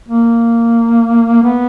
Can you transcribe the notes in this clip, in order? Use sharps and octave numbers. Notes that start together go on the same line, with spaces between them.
A#3
B3